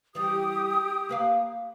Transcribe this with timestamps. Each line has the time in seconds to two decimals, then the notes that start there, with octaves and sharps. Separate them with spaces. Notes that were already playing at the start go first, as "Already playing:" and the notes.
0.15 E3 G3 G4 D#6
1.09 A#3 B4 F5